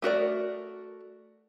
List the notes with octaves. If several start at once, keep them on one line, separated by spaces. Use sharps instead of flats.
A3 F#4 A#4 D5